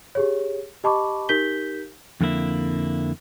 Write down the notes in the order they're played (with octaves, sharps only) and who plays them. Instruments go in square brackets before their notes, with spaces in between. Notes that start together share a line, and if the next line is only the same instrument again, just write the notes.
[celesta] G4 G#4 C#5
G4 D#5 A5 B5 C#6 D6
D#4 G4 A#4 G6 B6 G7
[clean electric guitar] F2 D3 A#3 E4 E5